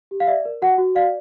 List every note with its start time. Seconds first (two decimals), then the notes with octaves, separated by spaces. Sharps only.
0.11 G4
0.20 F5
0.27 D5 E5
0.45 A#4
0.62 F#4 F#5
0.78 F#4
0.95 D5 F5